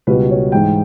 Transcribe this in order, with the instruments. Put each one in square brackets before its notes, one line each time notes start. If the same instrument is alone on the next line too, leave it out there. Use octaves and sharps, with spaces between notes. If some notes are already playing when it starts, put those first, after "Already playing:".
[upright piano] C#2 B2 G3 B4
C#5
G#2 E3 G#3 G5